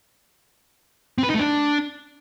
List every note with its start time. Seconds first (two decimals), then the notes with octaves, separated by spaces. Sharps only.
1.18 C4
1.24 B4
1.29 D#4
1.34 A3
1.39 D4